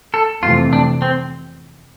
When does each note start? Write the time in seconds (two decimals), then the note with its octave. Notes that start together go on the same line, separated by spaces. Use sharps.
0.14 A4
0.43 F2 C3 E3 A3 C4 F4
0.73 D4
1.02 C4